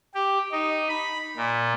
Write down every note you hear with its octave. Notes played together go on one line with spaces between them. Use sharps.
G4
D#4
B5
A#2